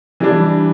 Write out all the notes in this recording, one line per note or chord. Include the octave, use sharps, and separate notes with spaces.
E3 G3 D4